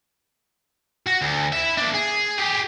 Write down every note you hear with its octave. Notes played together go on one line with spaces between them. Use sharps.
F#4
D2
E4 E5
A#3 D4
G#4
G4 G#4